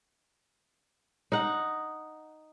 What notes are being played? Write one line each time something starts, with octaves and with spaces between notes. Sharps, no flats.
D#4 F#5